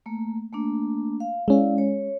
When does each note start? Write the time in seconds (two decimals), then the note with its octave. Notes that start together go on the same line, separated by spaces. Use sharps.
0.06 A3 A#3
0.53 A3 A#3 D4
1.20 F5
1.48 G#3 C#4 E4 D5 F5
1.78 C#5